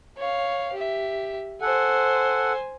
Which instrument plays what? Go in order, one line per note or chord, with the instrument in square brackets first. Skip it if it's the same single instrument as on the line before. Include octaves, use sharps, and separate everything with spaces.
[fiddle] C#5 F5
G4 E5
[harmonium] A4 F#5 [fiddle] C5 G#5